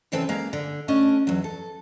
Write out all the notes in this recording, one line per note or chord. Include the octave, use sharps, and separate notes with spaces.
C#3 E3 C4 A4 B4
G#3 A#3 F5 A#5
D3
A3 C#4 D4 D#5
E2 F#3
A4